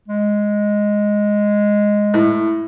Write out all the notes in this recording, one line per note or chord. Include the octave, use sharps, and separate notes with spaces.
G#3
A2